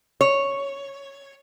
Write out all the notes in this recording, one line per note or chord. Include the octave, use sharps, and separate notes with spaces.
C#5